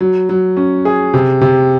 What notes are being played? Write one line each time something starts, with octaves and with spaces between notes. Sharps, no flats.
F#3
F#3
C#4
G#4
C3
C3